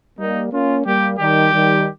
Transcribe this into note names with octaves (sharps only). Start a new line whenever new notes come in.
G3 A#3 D#4
A#3 C#4 F4
G3 A#3 G4
D#3 G3 G4
D#3 G3